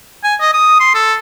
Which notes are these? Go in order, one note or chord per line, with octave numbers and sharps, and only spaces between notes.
G#5
D#5
D#6
C6
A4